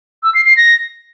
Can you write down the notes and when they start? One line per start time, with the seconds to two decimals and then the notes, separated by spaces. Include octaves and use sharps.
0.23 E6
0.34 C7
0.46 C7
0.57 A#6